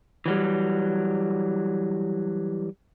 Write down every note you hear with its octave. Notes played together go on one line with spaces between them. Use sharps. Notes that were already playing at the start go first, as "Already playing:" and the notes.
E3 F#3 G3